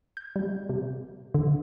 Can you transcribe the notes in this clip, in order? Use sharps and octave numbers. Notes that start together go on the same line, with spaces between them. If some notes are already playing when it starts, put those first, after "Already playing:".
G6
G3
C3
D3